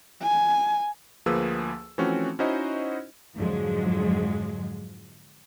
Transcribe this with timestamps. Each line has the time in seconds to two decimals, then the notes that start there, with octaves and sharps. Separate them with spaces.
0.22 G#5
1.26 D2 F3 A#3 G#4 B4 E6
1.98 E3 F3 A3 C4 C#4 F#4
2.39 C#4 D#4 E4 F#4 C5 D#5
3.35 F2 G#2 D3 F3 F#3 G#3